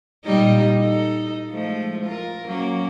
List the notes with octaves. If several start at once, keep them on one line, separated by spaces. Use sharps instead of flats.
A#2 G3 D#4
D#4 A4
F3 G#3 A3
F4 A#4
F#3 A#3 C#4